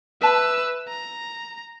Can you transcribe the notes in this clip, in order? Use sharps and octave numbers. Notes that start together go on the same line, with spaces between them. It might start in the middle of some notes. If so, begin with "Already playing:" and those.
B4 E5 A5 B5 E6
A#5